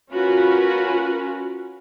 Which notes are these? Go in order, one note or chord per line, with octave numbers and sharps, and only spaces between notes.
C#4 F4 F#4 A#4 B4